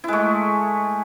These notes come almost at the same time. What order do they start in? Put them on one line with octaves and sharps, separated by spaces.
E4 G#3 A3